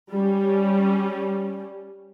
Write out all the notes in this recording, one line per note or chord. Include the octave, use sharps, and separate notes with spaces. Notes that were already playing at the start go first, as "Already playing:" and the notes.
G3 C#4